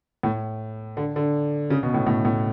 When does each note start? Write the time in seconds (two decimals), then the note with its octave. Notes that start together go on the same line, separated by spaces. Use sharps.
0.23 A2
0.97 D3
1.16 D3
1.70 C#3
1.83 B2
1.94 A2
2.07 A2
2.25 A2